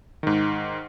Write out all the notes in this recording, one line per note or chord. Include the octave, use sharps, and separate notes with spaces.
G#2 D#3